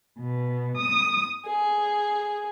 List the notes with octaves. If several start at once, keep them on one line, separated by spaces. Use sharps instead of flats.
B2
D#6
G#4